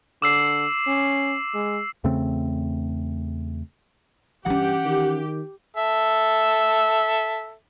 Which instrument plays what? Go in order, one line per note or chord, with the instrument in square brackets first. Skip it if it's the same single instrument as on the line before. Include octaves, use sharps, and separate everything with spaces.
[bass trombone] D3 [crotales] D6 E6 C7
[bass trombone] C#4
G#3
[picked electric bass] E2 C#3 A3 C4
[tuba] G2 [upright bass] E3 C#4 [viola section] G4 [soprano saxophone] F#5
[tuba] D#3
[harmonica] A4 E5